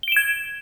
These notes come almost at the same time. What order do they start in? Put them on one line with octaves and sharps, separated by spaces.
G7 D7 E7 G#6